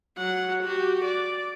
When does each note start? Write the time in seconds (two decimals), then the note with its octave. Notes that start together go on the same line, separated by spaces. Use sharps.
0.18 F#3 F#5
0.64 F#4 G4
1.05 D5